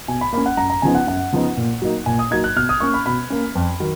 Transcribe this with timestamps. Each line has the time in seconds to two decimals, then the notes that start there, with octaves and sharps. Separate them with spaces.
0.08 B2 G#5
0.21 B5
0.33 A#3 C#4 B5
0.46 F#5
0.57 F#2 A#5
0.70 A#5
0.82 C#3 F3 B3 D#4 G#5
0.95 F#5
1.07 F#2 F#5
1.33 C#3 F3 B3 D#4
1.57 A#2
1.82 F#3 A#3 D#4
2.06 A#2 G#5
2.19 D#6
2.31 F#3 A#3 D#4 G#6
2.44 F#6
2.56 B2 F6
2.69 D#6
2.80 A#3 C#4 C#6
2.94 B5
3.06 B2 B5
3.30 A#3 C#4
3.55 F2
3.80 D#3 F#3